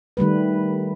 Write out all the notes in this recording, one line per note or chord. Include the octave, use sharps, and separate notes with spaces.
D#3 G3 A3 B4